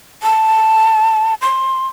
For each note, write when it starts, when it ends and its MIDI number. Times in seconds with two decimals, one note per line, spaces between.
0.23 1.34 81
1.42 1.87 84